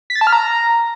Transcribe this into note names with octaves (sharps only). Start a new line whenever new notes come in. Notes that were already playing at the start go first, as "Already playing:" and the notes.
B6
A6
A5
F6
A#5